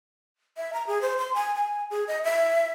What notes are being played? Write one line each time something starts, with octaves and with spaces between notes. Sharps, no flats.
E5
A#5
G#4
C5
C6
G#5
G#5
G#4
D#5
E5